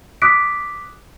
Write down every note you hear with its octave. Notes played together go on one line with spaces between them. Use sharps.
D6 D#6 F#6 B6 D7